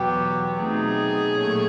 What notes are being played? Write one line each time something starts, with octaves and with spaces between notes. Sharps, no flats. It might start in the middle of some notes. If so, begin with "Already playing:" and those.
Already playing: E2 B2 F#3 B3 G4
B2 F#3 A3 C4 D#4 G#4
A#2 F#3 A3 C#4